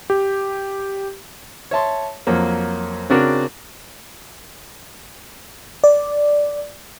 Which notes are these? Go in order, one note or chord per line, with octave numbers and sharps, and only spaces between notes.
G4
C#5 E5 A5 C6
F2 F#3 A#3
C#3 C4 D4 F#4 A#4
D5